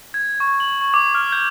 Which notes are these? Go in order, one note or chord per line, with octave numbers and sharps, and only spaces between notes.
G#6
C#6
F#7
C#6
D6
F6
G6